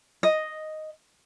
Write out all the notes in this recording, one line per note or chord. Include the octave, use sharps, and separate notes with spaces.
D#5